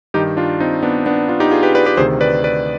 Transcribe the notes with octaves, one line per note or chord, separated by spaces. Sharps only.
G2 D#3 D#4 G4
D4 F4
C4 D#4
B3 D4
B3 D4
D4 F4
D#4 G4
F4 G#4
G4 B4
B4 D5
G4 B4
D2 C3 D#3 G#4 C5
B4 D5
B4 D5